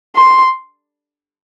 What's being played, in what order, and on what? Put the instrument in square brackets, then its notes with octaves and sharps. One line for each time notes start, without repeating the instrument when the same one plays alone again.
[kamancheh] C6